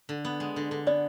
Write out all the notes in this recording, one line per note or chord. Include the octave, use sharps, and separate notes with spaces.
D3
B3
G#3
D3
D3
B3 D5